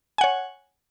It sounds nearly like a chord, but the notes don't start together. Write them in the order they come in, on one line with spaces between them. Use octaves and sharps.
G#5 F#5 C#5